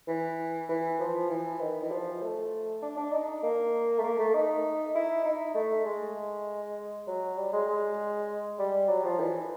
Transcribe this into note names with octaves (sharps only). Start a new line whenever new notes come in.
E3
E3
F3
E3
D#3
E3
F3
A3
D4
D4
D#4
A#3
A3
A#3
A3
D#4
E4
D#4
A3
G#3
F#3
G3
G#3
G#3
G3
F#3
F3
E3